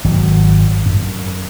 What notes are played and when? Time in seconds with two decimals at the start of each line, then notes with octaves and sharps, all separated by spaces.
0.04 G#1 F#3
0.86 F#2